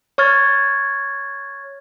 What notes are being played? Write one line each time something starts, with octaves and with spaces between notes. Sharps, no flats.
C#5 C#6 F6 G#6 A6